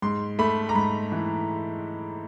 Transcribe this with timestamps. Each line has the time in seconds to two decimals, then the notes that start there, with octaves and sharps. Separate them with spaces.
0.02 G#2 C6
0.39 A3 B5
0.69 A#5
0.75 G#2 B5
1.12 E3